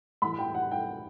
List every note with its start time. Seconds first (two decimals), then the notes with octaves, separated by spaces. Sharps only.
0.22 A2 E3 B5
0.39 G5
0.55 F#5
0.71 G5